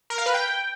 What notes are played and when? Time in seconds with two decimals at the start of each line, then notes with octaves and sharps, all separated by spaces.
0.10 A#4
0.18 F5
0.26 B4
0.34 G5